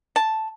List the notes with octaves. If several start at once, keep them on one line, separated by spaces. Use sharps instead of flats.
A5